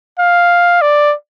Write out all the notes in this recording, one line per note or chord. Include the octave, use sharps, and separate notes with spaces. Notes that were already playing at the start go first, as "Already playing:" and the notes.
F5
D5